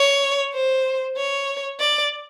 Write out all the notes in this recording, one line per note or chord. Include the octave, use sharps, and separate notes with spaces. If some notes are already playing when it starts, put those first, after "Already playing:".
Already playing: C#5
C5
C#5
D5